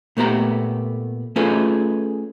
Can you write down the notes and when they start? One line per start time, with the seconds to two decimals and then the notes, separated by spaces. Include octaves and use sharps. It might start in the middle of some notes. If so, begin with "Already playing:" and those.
0.17 A#2 A3 B3 G4 A#5
1.36 A3 C#4 F4 G#4 A4 B4